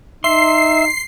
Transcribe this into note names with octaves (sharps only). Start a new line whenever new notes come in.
D#4 E5 C6 C7